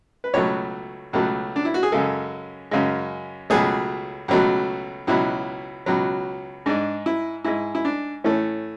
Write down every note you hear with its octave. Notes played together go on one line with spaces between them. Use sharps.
B4
C#2 B2 F#3 A3 C#5
C#2 B2 F#3 A3
D4
E4
F#4
G#4
F#2 C#3 G#3 A4
F#2 C#3 G#3
C#2 B2 F#3 A3 G#4
C#2 B2 F#3 A3
C#2 B2 F#3 E4
C#2 B2 F#3
G#2 G#3 D4
E4
G#2 G#3 E4
E4
D4
A2 E3 A3 C#4